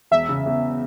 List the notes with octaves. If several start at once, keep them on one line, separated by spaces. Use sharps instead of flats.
E1 E5
C#3
E2